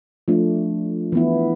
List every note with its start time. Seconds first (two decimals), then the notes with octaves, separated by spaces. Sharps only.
0.28 F3 A3 D4
1.12 E3 B3 E4